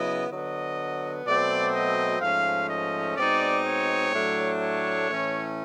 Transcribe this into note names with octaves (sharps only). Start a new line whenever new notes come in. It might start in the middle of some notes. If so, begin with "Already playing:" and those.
Already playing: C#3 F#3 B3 E4 D#5
D3 F#3 B3 D#5
B2 F#3 A3 C4 D5
D#5
G#2 F3 A3 C#4 F5
D#5
B2 G#3 C4 D#4 D5
C#5
A2 F#3 A3 D4
C#5
A2 E3 A3 C#4